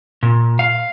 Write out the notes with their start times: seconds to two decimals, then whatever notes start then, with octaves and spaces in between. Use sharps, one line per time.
0.23 A#2
0.59 F5